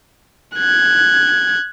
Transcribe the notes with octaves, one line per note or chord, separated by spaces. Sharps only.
F#6 G#6